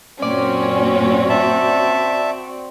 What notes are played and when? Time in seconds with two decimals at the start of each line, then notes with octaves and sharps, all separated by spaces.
0.22 F#2 A#2 C4 C#4 F#4 D5
1.29 E5 A5